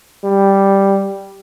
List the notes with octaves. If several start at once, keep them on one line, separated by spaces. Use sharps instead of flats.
G3